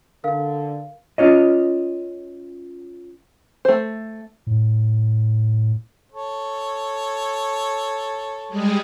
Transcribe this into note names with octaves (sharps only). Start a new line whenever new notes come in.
D3 A#4 F5
C#4 F4 C#5 D#5
A3 C5
A2
A4 C#5
G3 G#3 G#4